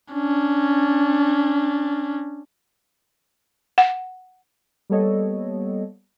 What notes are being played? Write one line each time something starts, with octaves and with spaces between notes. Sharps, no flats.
C#4 D4
F#5
G3 A#3 B3 A4 C#5 D#5